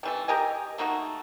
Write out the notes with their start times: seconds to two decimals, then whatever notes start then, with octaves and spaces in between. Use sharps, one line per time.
0.03 C3 E3 A3
0.28 G4 A#4 D#5 G#5
0.78 A3 A#3 D#4 F#4